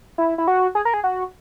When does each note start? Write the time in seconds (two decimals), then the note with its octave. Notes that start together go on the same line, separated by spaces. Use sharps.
0.18 E4
0.38 E4
0.48 F#4
0.75 G#4
0.85 A#4
0.94 G#4
1.04 F#4